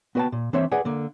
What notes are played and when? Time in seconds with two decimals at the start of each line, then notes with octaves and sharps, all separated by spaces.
0.15 B3 F#4 B4 F#5 G5 A5
0.32 A#2
0.53 E3 C4 D4 C5 C#5 E5
0.72 G#4 B4 D5 F#5 G#5
0.85 D3 A#3